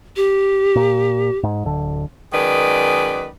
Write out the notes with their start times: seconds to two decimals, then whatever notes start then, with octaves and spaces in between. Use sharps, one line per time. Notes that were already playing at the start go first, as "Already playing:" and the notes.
0.16 G4
0.76 A#2
1.43 G#2
1.64 D1 D3
2.33 F#2 D#3 G#3 B4 D5